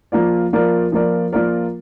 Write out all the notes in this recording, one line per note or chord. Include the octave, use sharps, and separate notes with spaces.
F3 A#3 F4 A#4 D5
F3 A#3 F4 A#4 D5
F3 A#3 F4 A#4 D5
F3 A#3 F4 A#4 D5